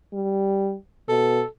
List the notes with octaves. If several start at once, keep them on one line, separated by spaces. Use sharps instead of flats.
G3
B2 A4